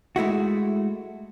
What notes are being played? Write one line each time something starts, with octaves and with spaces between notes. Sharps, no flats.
G#3 A3 E4 F#4